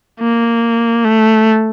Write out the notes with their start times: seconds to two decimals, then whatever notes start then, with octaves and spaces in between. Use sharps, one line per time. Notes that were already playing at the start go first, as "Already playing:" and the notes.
0.20 A#3
1.05 A3